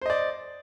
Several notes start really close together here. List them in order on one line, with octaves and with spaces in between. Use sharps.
C5 D#5 D5